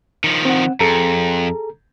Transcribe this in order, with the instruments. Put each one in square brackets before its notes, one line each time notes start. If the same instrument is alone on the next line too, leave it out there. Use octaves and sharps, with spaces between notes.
[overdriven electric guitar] D#3 F3
[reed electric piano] C4 F#5
[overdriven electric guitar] F2 [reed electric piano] G#4 A4 A#5